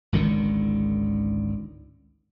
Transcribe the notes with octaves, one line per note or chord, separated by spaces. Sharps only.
G#1 C#2 D3 D#3